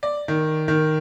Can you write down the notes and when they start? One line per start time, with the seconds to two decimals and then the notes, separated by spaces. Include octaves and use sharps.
0.03 D5
0.28 D#3
0.68 D#3